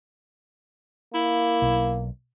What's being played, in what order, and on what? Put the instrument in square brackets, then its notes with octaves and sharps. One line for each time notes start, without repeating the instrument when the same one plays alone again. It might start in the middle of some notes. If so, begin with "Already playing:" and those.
[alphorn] A#3 [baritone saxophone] E4
[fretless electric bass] B1